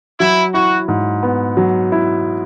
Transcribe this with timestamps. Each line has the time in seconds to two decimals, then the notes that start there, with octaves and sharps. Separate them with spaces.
0.20 F#3 E4
0.54 E4 F#4
0.88 G#2
1.23 B3
1.57 F#3
1.92 E4